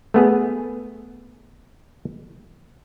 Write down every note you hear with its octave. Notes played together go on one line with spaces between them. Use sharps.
A3 B3 G#4